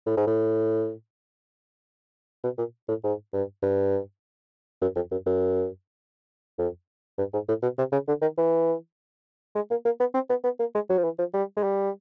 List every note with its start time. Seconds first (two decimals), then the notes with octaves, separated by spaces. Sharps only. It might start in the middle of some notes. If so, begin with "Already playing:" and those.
0.07 A2
0.17 G#2
0.27 A2
2.44 B2
2.58 A#2
2.89 A2
3.04 G#2
3.33 G2
3.63 G2
4.82 F#2
4.96 F2
5.11 F#2
5.26 F#2
6.58 F2
7.18 G2
7.33 G#2
7.48 A2
7.63 B2
7.78 C3
7.92 C#3
8.08 D3
8.22 D#3
8.37 E3
9.55 G#3
9.70 A#3
9.85 A#3
10.00 B3
10.14 C4
10.30 B3
10.44 B3
10.59 A#3
10.75 G#3
10.89 F#3
10.98 F3
11.04 E3
11.19 F3
11.34 G3
11.56 G#3
11.63 G3